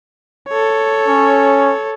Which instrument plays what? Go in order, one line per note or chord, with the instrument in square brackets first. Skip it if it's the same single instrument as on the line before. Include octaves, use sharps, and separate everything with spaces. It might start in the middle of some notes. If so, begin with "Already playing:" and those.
[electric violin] A4 C#5
[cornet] C#4